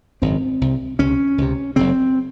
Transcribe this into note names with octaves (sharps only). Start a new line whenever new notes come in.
G#1 F#2 C#3 C4
C2 C3
C#2 C3 C#4
C#2 C3
F#1 F#2 C#3 C4